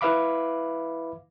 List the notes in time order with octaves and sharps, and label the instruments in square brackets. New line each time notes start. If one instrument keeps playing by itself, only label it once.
[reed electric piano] E4 B4 E5 F5 B5 D6